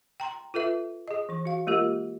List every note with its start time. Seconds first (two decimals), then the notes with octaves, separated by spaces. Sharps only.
0.20 G5 A#5 C6
0.54 F4 A4 B4 E5
1.08 G#4 D#5
1.29 E3 C#6
1.45 F#4 F5
1.67 G#3 A#3 F4 G4 A#4